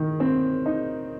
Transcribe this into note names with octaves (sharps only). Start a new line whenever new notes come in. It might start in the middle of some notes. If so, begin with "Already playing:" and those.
Already playing: D#3
C4
D#4